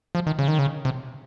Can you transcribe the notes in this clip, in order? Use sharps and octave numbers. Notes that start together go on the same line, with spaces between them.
F3
D#3
C#3
D#3
C#3
C3